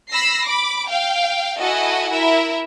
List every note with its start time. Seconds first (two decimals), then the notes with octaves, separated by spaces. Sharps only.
0.10 B5 E6 A#6 C7
0.46 B5 D6
0.89 F5 G5
1.58 E4 F#4 A4 D#5 F#5 G#5
2.11 E4 A#4 E5